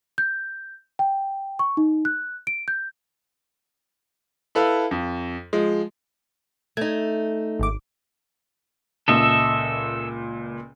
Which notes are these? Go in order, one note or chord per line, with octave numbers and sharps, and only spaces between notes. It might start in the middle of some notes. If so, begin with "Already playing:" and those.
G6
G5
C#6
D#4
F#6
D7
G6
E4 A4 B4 F5
F2
F3 G#3
A3 D#4 G#6
G#1 D6
C#2 A#2 A4 D#5 E5